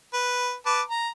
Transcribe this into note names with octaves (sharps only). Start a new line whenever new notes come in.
B4
B4 A5 D6
A#5